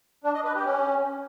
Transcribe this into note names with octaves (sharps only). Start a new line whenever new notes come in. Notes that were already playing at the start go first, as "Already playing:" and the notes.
D4
D#5
B4
G4
C#4